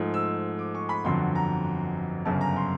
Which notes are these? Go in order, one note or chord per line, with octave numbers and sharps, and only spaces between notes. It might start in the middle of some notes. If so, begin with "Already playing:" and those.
Already playing: G#2 F3 A3
E6
D6
C#6
B5
G1 F2 D3 F#3 C6
A#5
G1 F#2 C#3 A5
A#5
C6